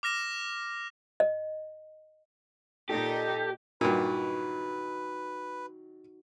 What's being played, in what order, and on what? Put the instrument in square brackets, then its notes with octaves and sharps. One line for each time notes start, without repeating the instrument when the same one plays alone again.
[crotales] D6 F6 A#6 E7
[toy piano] D#5
[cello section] A#2 D#4 [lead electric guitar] G4 [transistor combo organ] A4
[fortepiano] G2 A#2 [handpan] D#4 F#4 [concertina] B4